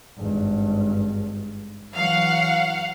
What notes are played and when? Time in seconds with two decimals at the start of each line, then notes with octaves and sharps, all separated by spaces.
0.18 G#1 G2
1.95 E3 F#3 F5 F#5